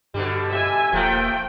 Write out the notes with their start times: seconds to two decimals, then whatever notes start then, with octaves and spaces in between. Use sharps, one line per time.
0.14 G2 B2 D3 G3
0.50 E5 G#5
0.93 E1 F3 A3 A#3 G5